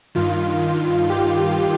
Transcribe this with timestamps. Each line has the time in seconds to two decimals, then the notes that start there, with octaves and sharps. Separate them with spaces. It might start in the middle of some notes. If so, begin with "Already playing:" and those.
0.15 G2 D#3 F4
1.10 G4